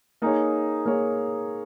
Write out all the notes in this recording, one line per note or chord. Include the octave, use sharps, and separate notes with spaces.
A#3 D#4 G#4 C#5
A#3 D#4 G#4 C#5